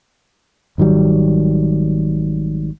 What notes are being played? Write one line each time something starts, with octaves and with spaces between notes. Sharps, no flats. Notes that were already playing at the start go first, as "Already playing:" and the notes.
G#1 D#3 F#3 G3